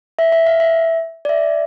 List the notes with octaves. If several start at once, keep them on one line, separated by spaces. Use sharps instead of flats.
E5
E5
F5
E5
D5
E5